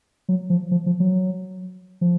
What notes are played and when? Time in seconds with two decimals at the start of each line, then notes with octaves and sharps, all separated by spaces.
0.29 F#3
0.50 F3
0.71 F3
0.86 F3
1.00 F#3
2.01 F3